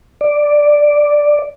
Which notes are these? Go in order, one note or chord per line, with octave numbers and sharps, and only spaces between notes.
D5